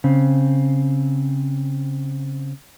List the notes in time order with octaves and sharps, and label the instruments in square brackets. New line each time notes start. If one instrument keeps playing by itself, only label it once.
[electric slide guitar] C#3 C4